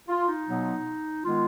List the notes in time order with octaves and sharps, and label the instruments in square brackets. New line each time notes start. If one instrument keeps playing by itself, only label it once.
[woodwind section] F4
D#4
B2 F#3 B3
D#3 G#3 B3 F4